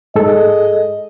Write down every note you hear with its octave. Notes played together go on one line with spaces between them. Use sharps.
G#2 G#4 A4 D#5